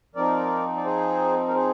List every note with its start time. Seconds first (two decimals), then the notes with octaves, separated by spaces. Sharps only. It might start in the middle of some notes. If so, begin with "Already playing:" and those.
0.15 F3 C4 D#4 A#4 D5
0.77 D5
0.85 G#4 C5
1.48 A#4
1.54 G#4 C5